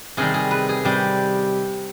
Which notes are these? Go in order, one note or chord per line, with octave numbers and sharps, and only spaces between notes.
C3 D#3 G3 G#4
G#4
B4
G#4
C3 G3 G4